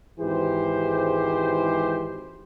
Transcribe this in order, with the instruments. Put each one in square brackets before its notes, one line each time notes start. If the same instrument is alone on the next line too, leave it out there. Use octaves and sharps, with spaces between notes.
[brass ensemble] G#1 G#2 E3 G4 C5